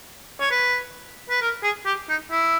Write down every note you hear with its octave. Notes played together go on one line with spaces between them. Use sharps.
C#5
B4
B4
A#4
G#4
G4
D#4
E4